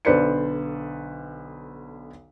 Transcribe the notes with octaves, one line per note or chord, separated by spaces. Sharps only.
B1 D3 B4 C5 D5 C#7